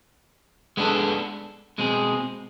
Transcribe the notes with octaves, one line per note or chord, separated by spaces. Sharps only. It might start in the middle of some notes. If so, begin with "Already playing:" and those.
G#3 B3 D4 A4
B2 G#3 C4 G#4